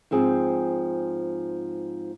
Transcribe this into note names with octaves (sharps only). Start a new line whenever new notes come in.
G#2 F3 C4 G#4